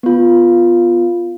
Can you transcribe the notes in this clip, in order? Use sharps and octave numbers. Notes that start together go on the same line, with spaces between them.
B3 F4